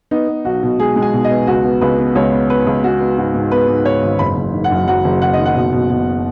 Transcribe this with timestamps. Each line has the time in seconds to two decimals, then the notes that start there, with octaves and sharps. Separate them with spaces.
0.11 B3 D#4
0.28 B3
0.45 B1 F#4
0.63 B2
0.79 G#3 G#4
0.96 G#3
1.02 G#5
1.13 B2
1.25 D#5
1.31 B3
1.47 C#2 F#4
1.64 B3
1.81 C#2 B4
1.98 B3
2.15 C#2 C#5
2.32 B3
2.50 B3 B4
2.67 C#2
2.84 G#3 F#4
3.00 B3
3.18 G#2 F#4
3.35 G#2
3.51 B3 B4
3.68 G#2
3.85 G#2 C#5
4.03 G#1
4.19 F#1 B5
4.37 F#1
4.53 D#3
4.64 F#5
4.71 F#2
4.87 F#3 F#5
5.04 F#1
5.22 F#1 F#5
5.34 D#3 D#5
5.46 F#5
5.56 B2
5.72 B2
5.90 B2